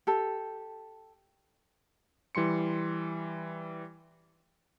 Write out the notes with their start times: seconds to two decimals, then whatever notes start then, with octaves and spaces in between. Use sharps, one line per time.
0.07 G4 A4
2.35 E3 G3 C6 C#7